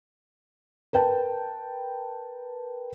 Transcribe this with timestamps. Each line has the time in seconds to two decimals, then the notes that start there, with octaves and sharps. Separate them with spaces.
0.93 A#4 B4 G5 A5